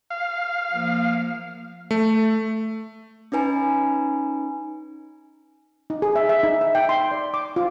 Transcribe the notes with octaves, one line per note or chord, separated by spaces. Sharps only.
F5
F3 A#3
A3
C#4 D#4 B4 G#5 A#5
D#4
G#4
E5
E5
D#4
E5
G5
C6
D5
D6
F4